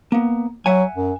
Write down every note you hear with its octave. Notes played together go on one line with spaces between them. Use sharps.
A#3 B3
F#3 E5 F#5 G#5
F#2